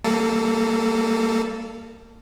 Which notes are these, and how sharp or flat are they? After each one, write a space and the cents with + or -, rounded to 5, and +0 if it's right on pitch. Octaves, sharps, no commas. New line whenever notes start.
G3 +10 A#3 -25 A4 +0